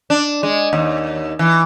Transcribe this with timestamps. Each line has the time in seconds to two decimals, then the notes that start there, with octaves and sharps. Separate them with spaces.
0.10 D4
0.43 G#3
0.73 D#2
1.39 E3